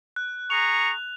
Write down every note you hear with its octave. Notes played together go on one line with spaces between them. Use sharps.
F#6
G#4 A#5 C#6 F7